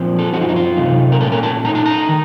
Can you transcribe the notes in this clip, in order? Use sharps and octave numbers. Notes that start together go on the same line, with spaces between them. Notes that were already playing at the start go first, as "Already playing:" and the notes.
Already playing: A#2 F3 C4
A4
F#2 F3 C4 D#4 F#4
F4
D#4
F4
C3 F#3 A3 D#4
A#4
A#2 A3 C#4 A4
A#4
A5
A2 A3 D#4 A#5
A5
A#5
D#3